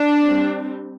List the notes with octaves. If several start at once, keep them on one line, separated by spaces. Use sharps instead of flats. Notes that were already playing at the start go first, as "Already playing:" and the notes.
Already playing: D4
G3 C4